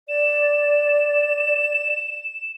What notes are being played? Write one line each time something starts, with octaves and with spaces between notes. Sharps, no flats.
D5 E7